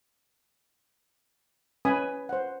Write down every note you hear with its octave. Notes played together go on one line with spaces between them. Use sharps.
C#4 B4 G#5 B5 D#6
C5 F#5